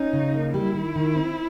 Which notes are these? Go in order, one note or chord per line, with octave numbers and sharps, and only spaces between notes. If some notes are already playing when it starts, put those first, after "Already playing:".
Already playing: C#4 D#4
C#3
A#3
G3 E4
D#3
D#3
C4